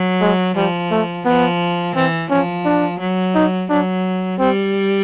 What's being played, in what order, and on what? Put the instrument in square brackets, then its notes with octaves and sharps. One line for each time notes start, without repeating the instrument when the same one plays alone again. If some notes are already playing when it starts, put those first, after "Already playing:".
Already playing: [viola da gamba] F#3
[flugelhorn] G#3
[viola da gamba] F3 [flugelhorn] G3
[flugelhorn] A3
[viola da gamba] F3 [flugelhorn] B3
[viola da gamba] E3 [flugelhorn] C4
[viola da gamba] F3 [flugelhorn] C#4
[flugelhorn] D4
[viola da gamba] F#3
[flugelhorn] D#4
[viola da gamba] F#3 [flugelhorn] D4
[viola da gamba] G3 [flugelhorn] C4